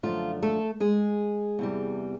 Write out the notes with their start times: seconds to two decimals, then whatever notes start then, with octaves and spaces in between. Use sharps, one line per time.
0.03 F#2 D3 F3 A3 D4 F4
0.43 A3 A4
0.80 G#3 G#4
1.59 E2 C3 E3 G3